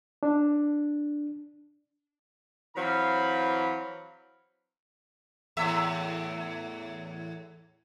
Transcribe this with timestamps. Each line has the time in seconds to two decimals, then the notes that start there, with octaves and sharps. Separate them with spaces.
0.23 D4
2.76 E3 F#3 C4 F5 B5
5.57 E2 A2 E5